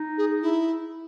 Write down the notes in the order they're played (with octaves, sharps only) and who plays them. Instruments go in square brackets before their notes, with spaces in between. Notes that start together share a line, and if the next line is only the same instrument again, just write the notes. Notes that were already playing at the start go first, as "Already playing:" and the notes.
Already playing: [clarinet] D#4
[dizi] G#4
E4